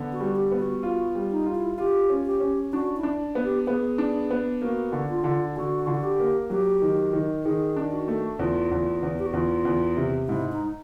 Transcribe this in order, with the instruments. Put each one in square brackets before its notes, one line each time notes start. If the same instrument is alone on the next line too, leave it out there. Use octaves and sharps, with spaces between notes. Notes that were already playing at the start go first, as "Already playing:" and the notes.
Already playing: [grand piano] D3 B3
[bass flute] F#4
[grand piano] G3
[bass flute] G4
[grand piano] B3
[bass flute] F#4
[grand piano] F4 [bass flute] F#4
[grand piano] G3
[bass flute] D#4
[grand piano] F4
[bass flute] E4
[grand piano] F4 [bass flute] G4
[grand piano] C#4
[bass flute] G4
[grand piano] C#4
[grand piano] D4 [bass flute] F#4
[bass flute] E4
[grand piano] D4
B3
[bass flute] G4
[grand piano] B3 [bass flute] G#4
[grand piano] D4
B3
[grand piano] A#3 [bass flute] F#4
[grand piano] D3
[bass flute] F4
[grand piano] D3
[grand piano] D3 [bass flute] F#4
[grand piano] D3 [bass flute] F4
[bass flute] F#4
G4
[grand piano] A#3
[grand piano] F#3 [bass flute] G4
[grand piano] D#3
D#3
[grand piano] D#3 [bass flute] G#4
[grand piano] D4
[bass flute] F#4
[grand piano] A3
[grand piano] E2 [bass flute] F4
[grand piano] E2
E2
[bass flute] G4
F#4
[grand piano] E2 [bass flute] F4
[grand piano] E2
C3
[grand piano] G#2 [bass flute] E4
[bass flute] D#4